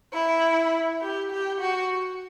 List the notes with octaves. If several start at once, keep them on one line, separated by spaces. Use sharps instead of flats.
E4
G4
G4
F#4